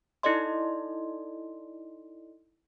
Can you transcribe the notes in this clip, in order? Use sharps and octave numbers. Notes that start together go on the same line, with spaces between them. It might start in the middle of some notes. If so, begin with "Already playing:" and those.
D#4 E4 A4 D5 D#5 C6